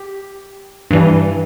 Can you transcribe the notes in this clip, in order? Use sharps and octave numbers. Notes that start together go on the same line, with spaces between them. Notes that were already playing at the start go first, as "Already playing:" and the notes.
Already playing: G4
G2 E3 G3